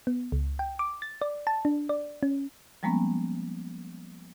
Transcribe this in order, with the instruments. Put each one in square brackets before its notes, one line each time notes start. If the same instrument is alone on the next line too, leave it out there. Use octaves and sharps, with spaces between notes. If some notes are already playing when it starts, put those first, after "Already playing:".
[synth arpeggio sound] B3
C#2
G5
D6
A6
D5
A5
D4
D5
C#4
[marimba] F3 G3 G#3 A#3 B3 C#4